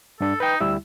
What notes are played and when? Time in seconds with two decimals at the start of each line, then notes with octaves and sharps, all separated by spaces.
0.21 G2 D4 A4
0.40 D#4 B4 G5
0.61 D2 G3 E4 E6